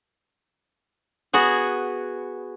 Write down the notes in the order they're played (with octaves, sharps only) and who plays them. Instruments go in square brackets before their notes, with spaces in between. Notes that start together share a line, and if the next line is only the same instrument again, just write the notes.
[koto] B3 F#4 G#4